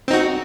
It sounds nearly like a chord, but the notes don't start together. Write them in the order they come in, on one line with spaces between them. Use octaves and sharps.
C4 D#4 F#4